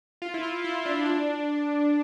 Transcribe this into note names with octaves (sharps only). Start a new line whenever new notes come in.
F4
E4
F4
E4
D4
D4